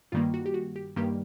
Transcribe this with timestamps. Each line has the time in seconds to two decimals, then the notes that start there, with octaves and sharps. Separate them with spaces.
0.12 G2 D#3 G3 A#3 F4
0.34 F#4
0.46 G4
0.54 F#4
0.76 G4
0.96 G2 D#3 G3 A#3 G4